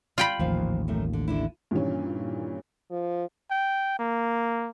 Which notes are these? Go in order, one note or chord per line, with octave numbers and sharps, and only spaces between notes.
F4 G5 B5
A1 D#2 A#2 F3 F5
F#2 D#3 A3
D3
D3 D4 E4
G2 A#2 D#3 E3 G3 C#4
F3
G5
A#3